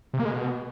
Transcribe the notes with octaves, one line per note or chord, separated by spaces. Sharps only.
C3
A#3
G#3
B2